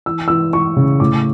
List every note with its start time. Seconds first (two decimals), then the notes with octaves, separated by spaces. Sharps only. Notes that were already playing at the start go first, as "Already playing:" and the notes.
0.06 E3 E6
0.28 E3 E6
0.53 E3 C#6
0.77 C#3
1.00 A2 D6